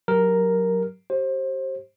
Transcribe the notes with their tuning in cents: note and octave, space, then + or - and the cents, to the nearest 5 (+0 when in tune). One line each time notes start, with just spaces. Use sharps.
F#3 +0 G4 +0 A#4 +0
G4 -25 C5 +25